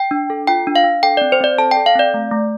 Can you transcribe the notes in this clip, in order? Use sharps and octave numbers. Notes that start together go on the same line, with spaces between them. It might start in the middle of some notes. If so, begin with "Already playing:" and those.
Already playing: G5
D4
A4
F4 G5
D4
F5
D4
A4 G5
C4 D5
C5
C4 D5
A4 A5
G5
A4
F5
C4 D5
A3
A3